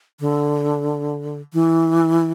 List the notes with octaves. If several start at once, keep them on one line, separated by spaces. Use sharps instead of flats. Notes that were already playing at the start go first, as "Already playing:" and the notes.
D3
E3